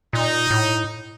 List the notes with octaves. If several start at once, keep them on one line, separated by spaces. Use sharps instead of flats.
A#2 D#4
A2